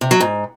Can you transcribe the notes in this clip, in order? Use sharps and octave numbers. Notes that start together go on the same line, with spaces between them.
C3
F#3
G#2